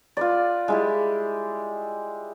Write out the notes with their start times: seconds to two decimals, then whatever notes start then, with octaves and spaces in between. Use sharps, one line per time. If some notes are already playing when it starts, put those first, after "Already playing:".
0.17 F4 B4 D5
0.68 G#3 E4 G4